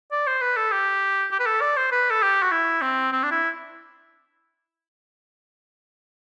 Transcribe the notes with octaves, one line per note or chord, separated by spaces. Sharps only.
D5
C5
B4
A4
G4
G4
B4
A4
D5
C5
B4
A4
G4
F#4
E4
C4
C4
D4
E4